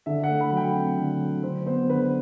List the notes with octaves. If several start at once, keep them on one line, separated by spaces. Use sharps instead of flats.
D3 E5
A3 F#5
B5
F#3
G5
C4
D3
F#3
D3 C5
B3 C5
D3 B4